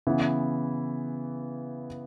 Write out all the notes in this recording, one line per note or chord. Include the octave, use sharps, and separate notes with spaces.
C#3 E3 B3 E4